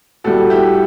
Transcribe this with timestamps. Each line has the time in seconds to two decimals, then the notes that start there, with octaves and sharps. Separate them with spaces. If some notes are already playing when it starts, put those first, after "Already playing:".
0.24 A2 G3 F#4 A4
0.50 E4 G4